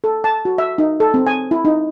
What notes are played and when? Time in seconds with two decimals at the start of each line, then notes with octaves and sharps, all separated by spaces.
0.04 A4
0.24 A5
0.45 F#4
0.58 E5
0.78 D#4
1.00 A4
1.14 C4
1.27 G#5
1.51 E4
1.65 D#4